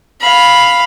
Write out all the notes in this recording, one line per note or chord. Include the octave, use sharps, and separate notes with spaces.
F5 B5